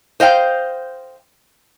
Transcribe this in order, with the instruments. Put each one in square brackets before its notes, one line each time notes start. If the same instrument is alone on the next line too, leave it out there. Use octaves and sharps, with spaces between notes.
[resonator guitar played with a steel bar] C5 D#5 F5 G5